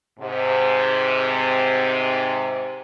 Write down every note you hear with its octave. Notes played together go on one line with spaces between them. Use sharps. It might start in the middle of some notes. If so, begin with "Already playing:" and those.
G#2 C3